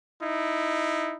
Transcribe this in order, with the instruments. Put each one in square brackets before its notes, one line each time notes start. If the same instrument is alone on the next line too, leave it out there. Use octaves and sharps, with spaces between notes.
[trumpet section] D#4 E4